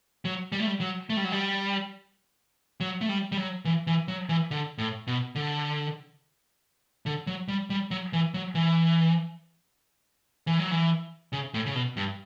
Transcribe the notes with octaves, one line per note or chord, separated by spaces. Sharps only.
F#3
G3
A3
G3
F#3
A3
G3
F#3
G3
F#3
A3
G3
G3
F#3
E3
E3
F#3
E3
D3
A2
B2
D3
D3
F#3
G3
G3
F#3
E3
F#3
E3
E3
F#3
E3
C#3
A2
C#3
B2
G2